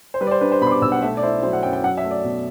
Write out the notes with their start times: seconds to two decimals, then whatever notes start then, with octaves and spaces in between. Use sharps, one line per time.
0.14 C5
0.21 G3 B4
0.27 D5
0.31 C5
0.41 D4 B4
0.52 C5
0.61 B2 B5
0.67 C6
0.72 D6
0.82 B1 E6
0.92 F#5
1.02 A3 E5
1.17 D5
1.23 E4 C5
1.43 F#3 C5
1.53 F#5
1.63 F#2 G5
1.73 G5
1.83 F#3 F#5
1.97 E5
2.04 A3
2.11 D5
2.24 B2